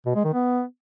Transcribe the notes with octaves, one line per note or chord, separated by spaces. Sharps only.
B2
G#3
D#3
B3